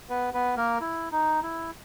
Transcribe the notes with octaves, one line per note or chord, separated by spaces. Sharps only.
B3 B4
B3 B4
A#3 A#4
E4
D#4
E4